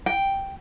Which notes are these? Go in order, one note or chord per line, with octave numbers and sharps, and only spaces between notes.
G5